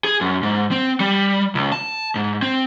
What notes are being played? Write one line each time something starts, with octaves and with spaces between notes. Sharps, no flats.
G#4
F#2
G#2
C4
G3
C#2
A5
G#2
C4